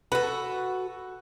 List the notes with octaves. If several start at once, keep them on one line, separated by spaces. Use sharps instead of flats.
F#4 A4 B4